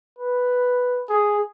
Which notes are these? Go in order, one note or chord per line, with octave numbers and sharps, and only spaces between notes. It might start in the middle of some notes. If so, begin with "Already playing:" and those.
B4
G#4